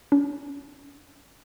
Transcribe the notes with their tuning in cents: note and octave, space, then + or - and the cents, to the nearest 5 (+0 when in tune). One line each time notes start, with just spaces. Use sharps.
C#4 +40